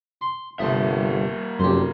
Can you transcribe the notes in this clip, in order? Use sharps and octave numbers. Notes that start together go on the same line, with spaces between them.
C6
G1 C3 A3 A#3 E5 D#6
F1 F#2 G4 C5